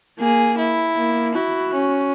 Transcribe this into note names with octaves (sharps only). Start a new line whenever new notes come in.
A#3 G#4
E4
A#3
E4 F#4
C#4